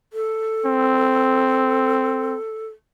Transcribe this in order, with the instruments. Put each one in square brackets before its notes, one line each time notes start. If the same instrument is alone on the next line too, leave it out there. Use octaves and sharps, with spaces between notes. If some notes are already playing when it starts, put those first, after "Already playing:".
[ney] A4
[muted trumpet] C4